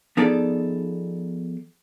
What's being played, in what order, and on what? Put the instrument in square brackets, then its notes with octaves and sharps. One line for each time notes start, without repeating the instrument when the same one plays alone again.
[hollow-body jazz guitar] F3 B3 D#4 G#4 A4 D5